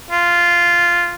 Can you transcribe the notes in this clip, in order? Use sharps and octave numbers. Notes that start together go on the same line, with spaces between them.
F4